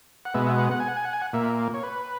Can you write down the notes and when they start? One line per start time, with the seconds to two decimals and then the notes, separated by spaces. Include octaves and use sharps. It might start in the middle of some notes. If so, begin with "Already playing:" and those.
0.25 F#5
0.34 B2 G#3 B3 E5
0.47 E5
0.59 F#5
0.71 F#5
0.80 G#5
0.88 F#5
0.96 G#5
1.05 F#5
1.13 G#5
1.22 F#5
1.33 A#2 A#3 E5
1.74 C#5
1.83 B4